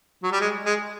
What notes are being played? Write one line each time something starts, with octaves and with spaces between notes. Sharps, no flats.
F#3
G3
G#3
G#3